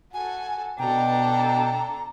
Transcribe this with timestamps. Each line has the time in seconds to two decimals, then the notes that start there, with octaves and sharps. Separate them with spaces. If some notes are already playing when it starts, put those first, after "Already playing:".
0.14 F#4 A4 G#5
0.79 B2 D4 A4 G5 A#5